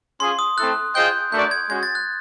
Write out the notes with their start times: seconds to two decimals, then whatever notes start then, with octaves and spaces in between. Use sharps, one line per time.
0.20 C#4 F4 G#4 C6
0.39 D#6
0.57 A3 C4 E4 A4 F#6
0.95 F4 G#4 C5 D#5 G5 G6
1.32 A3 D4 F#4 A#4 D5 G6
1.51 G#6
1.70 G#3 C#4 F#4 G#6
1.83 A6
1.95 F#6